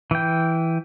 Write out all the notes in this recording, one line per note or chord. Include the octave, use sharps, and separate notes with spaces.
E3 G5